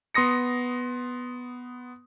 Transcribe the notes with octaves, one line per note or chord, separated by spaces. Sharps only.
B3 C6 D#6 A#6 C#7